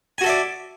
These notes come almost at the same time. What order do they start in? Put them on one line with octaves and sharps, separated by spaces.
G#5 F#4 A4 E5 D5